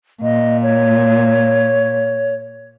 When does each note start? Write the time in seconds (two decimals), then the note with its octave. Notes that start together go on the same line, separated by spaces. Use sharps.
0.23 A#2 D#5
0.62 C#5